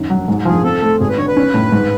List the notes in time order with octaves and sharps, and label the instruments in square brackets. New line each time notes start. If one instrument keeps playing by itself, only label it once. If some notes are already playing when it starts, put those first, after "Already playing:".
Already playing: [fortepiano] F#2 D#3
F#3
G#2
[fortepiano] F3 [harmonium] G#4
[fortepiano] C4 [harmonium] A4
[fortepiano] A3
[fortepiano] G#1 [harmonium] G#4
[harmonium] B4
[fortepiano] D3 [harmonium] C#5
[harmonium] B4
[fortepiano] C#4
A2
G#2